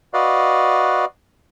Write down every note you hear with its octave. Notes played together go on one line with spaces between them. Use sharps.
F#4 B4 D5 D#5 F5